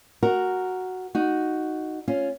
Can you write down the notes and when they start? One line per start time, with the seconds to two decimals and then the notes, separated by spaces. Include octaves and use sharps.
0.23 F#4 A#4
1.15 D#4 F#4
2.08 C#4 F4